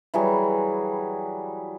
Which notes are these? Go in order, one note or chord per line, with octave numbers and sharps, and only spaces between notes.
E3 F#3 G3 G#4